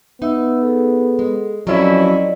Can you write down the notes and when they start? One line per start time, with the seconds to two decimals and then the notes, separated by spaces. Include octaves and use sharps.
0.22 B3 D#4 E5 E6
0.62 G#4 A4
1.19 G#3
1.67 F2 F#3 C#4 E4 D5 D#5